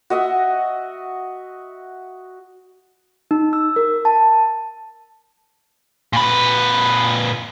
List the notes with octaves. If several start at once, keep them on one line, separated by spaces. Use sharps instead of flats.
F#4 D#5 E5 F#5
D#4
E6
A#4
A5
A#2 B4